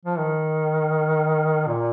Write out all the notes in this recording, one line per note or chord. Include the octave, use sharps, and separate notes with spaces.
F3
D#3
A#2